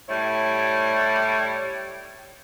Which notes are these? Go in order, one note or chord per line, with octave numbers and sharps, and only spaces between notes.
A2 G3 E4 C#5 D5